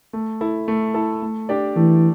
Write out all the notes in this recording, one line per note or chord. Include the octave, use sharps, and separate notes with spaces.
A3
E4 A4
A3
E4 A4
A3
D4 G4 D5
E3 A3